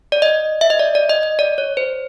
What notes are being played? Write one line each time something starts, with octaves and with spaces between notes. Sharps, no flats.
D5
D#5
E5
D#5
D5
D5
D#5
D#5
D5
C#5
C5